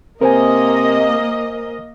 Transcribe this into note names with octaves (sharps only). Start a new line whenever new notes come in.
C3 A#3 A#4 C5 D#5 G#5